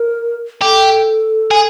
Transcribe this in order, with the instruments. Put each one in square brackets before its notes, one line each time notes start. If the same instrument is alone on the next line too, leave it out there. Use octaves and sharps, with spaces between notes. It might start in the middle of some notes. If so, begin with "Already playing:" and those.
Already playing: [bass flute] A#4
[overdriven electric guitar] G4 [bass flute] A4
[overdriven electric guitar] G#4